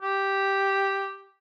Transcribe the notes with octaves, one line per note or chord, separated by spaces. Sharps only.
G4